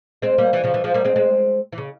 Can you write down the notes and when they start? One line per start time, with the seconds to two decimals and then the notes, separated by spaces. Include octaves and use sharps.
0.22 G#3 C4
0.38 G3 A#3
0.53 E3 G3
0.64 C#3 F3
0.74 E3 G3
0.84 F3 G#3
0.94 G3 A#3
1.05 G#3 C4
1.16 G#3 C4
1.72 E3
1.78 C#3